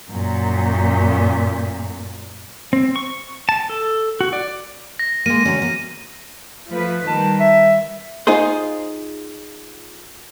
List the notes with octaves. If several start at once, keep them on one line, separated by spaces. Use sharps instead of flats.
F#2 A#2
C4
C#6
A5
A4
F#4
D5
A#6
G#3 A#3 D#7
D3 F#3 C#4
A#3
F3 A3 B4
D#3 G3 A5
E5
D#4 F4 G#4 C5